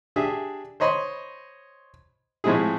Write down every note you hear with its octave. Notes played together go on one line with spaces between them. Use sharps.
D4 G4 G#4 E5
C5 C#5 D#5 B5 C6
A2 F3 G#3 C4 E4 G#4